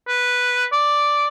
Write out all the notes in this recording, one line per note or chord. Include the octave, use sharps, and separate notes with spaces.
B4
D5